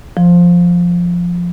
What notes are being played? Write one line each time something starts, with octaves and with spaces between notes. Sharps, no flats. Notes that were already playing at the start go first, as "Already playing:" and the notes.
F3